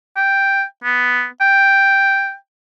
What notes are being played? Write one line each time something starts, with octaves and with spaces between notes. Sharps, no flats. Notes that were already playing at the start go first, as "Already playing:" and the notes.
G5
B3
G5